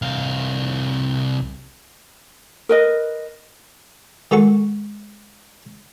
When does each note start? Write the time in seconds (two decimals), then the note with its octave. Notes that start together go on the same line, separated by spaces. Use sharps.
0.02 C2 F5
2.69 A#4 B4 D#5
4.31 D#3 G#3 F#4 A4 C#6